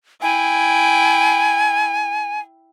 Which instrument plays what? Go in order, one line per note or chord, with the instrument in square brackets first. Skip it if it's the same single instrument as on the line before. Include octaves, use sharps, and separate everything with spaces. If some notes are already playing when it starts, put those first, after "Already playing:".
[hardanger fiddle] E4 G5 [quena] G#5